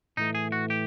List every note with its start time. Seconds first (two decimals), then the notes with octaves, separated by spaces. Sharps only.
0.17 A2 E3 A3 D#4
0.35 G#4
0.52 F#4
0.70 G4